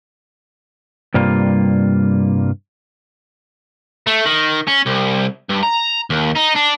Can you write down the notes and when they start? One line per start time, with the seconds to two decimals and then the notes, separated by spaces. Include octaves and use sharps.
1.14 G2 C3 G3 A#3 F4
4.07 A3
4.25 D#3
4.68 C#4
4.86 C2
5.50 G2
5.63 A#5
6.10 D#2
6.35 D#4
6.55 D4